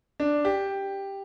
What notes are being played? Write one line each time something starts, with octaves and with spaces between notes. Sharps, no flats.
D4
G4